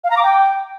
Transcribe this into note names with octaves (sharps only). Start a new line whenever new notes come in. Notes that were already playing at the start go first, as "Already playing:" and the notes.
F5
A#5
D6
G5